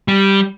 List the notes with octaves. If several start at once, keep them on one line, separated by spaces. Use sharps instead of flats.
G3